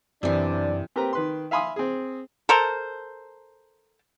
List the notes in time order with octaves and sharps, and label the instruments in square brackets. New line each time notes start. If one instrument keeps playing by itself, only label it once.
[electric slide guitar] F#2 [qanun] C3 E3 [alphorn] D4 [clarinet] D5
[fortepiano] C4 G4 A#4 B4 A#5
D#3 B4 C6
E5 F5 G#5 B5 C6 D#6
C4 G#4
[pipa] A4 A#4 C5